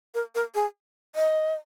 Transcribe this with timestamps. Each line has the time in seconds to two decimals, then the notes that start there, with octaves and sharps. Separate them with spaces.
0.14 A#4
0.35 A#4
0.55 G#4
1.15 D#5